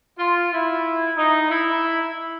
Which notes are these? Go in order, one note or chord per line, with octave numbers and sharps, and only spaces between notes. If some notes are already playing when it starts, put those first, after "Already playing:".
F4
E4
D#4
E4